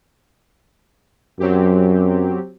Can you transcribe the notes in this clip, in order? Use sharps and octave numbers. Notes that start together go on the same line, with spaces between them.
F#2 F#3 C4 G4